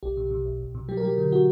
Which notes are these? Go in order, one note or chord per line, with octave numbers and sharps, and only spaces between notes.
B1 G4
B2
B2
B1
B1
B2
F#3 G4
A#4
F#3 G4
D3
D3 F#4